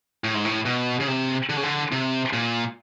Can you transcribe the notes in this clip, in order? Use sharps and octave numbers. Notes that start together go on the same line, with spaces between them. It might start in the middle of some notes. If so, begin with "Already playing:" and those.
A2
G#2
A2
B2
C#3
C3
D3
C#3
D3
C3
A#2